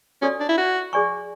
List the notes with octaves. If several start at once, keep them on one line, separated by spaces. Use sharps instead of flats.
C#4 F#4 A4 D5
D4
E4
F#4
G#4 D5 G#5 C#6